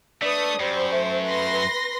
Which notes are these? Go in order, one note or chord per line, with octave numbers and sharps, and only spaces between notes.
A3 D4 B4 D#6
F#2 G3 C5
A3
B4 C6 A#6